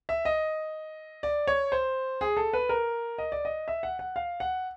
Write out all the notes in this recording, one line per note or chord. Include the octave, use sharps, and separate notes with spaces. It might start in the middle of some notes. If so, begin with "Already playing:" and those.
E5
D#5
D5
C#5
C5
G#4
A4
B4
A#4
D#5
D5
D#5
E5
F#5
F#5
F5
F#5